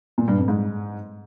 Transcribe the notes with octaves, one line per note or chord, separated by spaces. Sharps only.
A#2
G2
F2
G#2